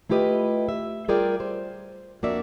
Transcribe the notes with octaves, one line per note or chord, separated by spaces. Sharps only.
A3 E4 F4 G4 B4 D#5
E5
G3 F4 G#4 A#4 D5 G5
C5
F2 A#3 D4 F#4 D5 E5